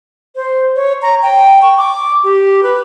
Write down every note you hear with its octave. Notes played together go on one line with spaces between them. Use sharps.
C5
C#5
A#5
G5
C#6
D6
G4
B4